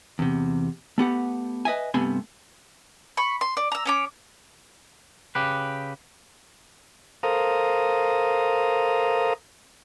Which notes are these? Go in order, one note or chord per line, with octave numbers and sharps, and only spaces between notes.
E2 C3
A3 B3 G4 F#5
B4 D#5 E5 G#5
G2 C3 A3 B3 G#5 C6
B5 C#6
C6
D5
A#5 E6
C#4 C#5 D6
C#3 G4 B4
A4 A#4 C5 F5 A#5 D#6